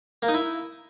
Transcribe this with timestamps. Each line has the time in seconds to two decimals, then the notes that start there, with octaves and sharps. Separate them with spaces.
0.22 A#3
0.28 D#4
0.34 E4